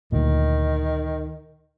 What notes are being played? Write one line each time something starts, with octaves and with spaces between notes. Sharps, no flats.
D2 A#2 D#3